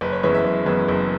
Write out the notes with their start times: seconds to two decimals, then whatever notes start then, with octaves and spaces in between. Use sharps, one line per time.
0.01 F#1 B4
0.13 C#5
0.23 F#2 E3 G#3 B3 C#5
0.35 E5
0.44 F#1
0.66 F#2 E3 G#3 B3
0.88 F#1